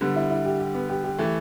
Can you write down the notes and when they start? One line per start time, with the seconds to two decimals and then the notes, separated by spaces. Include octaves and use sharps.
0.01 D3 G3 B3
0.16 E4
0.30 E4
0.45 G4
0.60 G4
0.75 B3
0.89 G4
1.04 G4
1.18 E3 A3